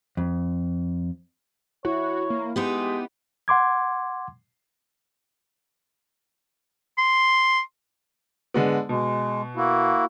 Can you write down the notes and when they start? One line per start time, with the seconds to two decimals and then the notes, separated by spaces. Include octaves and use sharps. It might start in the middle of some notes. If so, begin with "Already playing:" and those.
0.17 F2
1.85 E4 F#4 C#5
2.30 A#3
2.56 G#3 B3 D#4 G4 B4
3.48 F#5 C6 D6 G#6
6.98 C6
8.54 D3 G#3 B3
8.89 B2 G#3
9.56 A#3 E4 F#4